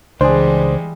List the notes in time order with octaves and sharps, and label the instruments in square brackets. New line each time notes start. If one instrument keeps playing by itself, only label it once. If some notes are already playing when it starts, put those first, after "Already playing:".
[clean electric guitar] C#2 [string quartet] E3 G3 G#3 [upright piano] D4 G#4 [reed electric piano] C5